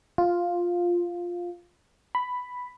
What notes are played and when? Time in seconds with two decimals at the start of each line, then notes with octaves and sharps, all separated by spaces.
0.18 F4
2.15 B5